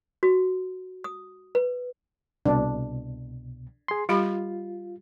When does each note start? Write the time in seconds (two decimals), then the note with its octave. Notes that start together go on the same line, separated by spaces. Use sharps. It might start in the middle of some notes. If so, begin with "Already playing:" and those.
0.23 F#4
1.04 D#6
1.55 B4
2.46 C2 B2 D4
3.88 G#4 C6
4.09 G3 F4 G4 B5